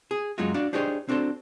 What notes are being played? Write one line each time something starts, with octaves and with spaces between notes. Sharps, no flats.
G#4
F#2 F#3 G#3 D#4 F4 F#4
D4 F#4 D5 F5
D4 D#4 G4 G#4 C5 C#5
C4 D4 F#4 A4 C5